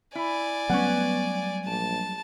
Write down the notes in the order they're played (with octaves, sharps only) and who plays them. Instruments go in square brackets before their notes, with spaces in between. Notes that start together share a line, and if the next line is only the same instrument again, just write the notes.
[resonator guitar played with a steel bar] E4 [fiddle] D5 G#5
[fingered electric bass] F#3 G3 A3 [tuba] B3 [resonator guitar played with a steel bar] C#4 F#5
[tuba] A#1 [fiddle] A5